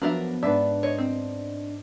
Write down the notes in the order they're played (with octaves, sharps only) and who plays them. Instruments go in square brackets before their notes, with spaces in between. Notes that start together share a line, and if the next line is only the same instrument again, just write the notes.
[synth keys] F3 F#3 B3 [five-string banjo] D4 A#4 E5
[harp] G#2 B3 B4 [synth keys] D4 [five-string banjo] E5
[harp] C5 D#5 [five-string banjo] C#5
[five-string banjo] C4